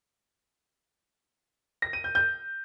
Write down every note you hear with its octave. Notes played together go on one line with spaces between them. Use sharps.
A#6
D#7
G6
G6